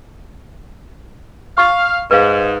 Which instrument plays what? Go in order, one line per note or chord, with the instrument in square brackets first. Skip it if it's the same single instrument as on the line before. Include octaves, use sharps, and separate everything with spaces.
[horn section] F5 [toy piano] C#6
[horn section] G#2 [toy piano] B4 F5